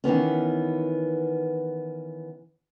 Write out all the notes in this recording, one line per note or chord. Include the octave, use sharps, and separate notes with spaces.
D#3 E3 B3 C#4